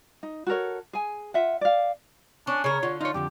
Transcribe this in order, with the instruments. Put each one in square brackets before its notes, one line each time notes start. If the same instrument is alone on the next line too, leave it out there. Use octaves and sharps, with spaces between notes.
[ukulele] D#4
F#4 A4 A#4 C#5
G#4 G#5
F4 E5 F#5
D5 F5
[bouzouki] C#4 [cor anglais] D4
[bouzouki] C#3 A#4 [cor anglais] C#5
[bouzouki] D3 [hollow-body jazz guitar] F4
[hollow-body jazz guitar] D#4 C#5 [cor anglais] F4
[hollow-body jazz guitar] F2 D3 F3 [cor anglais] G4